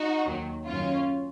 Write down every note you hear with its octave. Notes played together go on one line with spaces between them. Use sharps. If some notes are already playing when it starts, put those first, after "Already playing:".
Already playing: D#4 F#4
D#2 D#3 F#3
F#2 D#3 F#3 C#4 F4